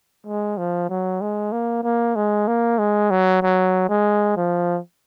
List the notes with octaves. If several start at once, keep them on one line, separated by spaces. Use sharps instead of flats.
G#3
F3
F#3
G#3
A#3
A#3
G#3
A#3
G#3
F#3
F#3
G#3
F3